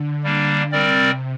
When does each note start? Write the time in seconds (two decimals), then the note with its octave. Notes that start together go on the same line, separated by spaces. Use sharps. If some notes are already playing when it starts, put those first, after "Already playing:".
Already playing: D3
0.24 G3 A#3 D4
0.72 C3 G3 C4 A#4 D5